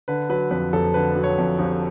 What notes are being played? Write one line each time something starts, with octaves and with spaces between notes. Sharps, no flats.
D3 B4
F#3 B4
F2 B4
F1 A4
D3 B4
F#3
C#5
F2
F1